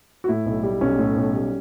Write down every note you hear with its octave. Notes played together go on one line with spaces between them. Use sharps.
F#4
A2 E4
B1
G3
B1 C#4
A2
B1
G3